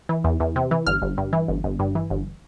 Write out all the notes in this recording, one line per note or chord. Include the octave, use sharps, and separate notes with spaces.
E3
E2
E2
C3
E3
G1 F6
G1
G2
E3
G1
G1
G2
E3
G1